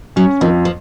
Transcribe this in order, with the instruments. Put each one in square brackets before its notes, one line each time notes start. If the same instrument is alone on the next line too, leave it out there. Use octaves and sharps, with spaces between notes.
[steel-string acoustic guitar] F#3 [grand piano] C#4
[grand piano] F2 [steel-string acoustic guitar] D#3
[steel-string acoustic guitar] F3